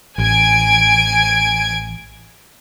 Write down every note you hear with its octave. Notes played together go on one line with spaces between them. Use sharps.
A1 G#5 G#6 D7